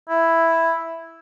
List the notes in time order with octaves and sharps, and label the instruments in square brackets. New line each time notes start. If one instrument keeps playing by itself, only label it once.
[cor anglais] E4